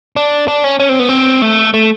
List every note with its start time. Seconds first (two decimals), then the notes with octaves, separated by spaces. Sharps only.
0.16 D4
0.48 D4
0.64 C#4
0.80 C#4
0.89 C4
0.99 B3
1.09 C4
1.42 A3
1.74 A3